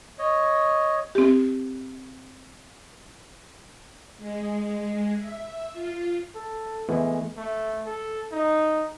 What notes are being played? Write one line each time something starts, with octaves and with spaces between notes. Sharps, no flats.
C#5 D#5
C4 G4
G#3
E5
F4
A4
E3 G#3 A3 B3
A3
A4
D#4